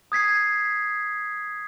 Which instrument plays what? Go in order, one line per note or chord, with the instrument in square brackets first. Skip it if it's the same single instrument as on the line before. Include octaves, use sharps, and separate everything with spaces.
[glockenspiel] D#6 G#6 B6 C7